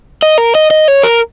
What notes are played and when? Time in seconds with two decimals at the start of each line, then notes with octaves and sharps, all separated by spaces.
0.22 D#5
0.38 A#4
0.55 D#5
0.71 D#5
0.88 C#5
1.03 A#4